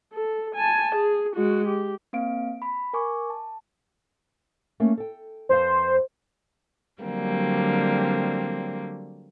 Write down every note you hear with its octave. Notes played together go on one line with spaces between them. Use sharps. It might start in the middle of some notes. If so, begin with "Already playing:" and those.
A4
G#5 A5
G#4
G#3 F#4
G4
A#3 C4 F5 D7
B5
A#4 G#5 C#6 D6
A5
A3 A#3 C#4
A4 G5
F2 B4 C5 F5
D3 F#3 G3 A#3 C4